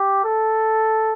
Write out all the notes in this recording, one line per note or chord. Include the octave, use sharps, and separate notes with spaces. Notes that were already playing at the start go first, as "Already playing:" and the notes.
Already playing: G4
A4